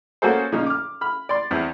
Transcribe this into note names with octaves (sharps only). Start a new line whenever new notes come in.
A#3 C#4 F#4 G#4 A4 C5
A#2 C#3 F3 D#4
D6 F6
B5 F6
D5 C6
E2 C4 E4